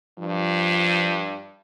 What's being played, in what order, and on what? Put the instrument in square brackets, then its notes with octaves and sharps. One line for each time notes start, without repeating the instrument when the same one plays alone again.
[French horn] G2 [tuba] F3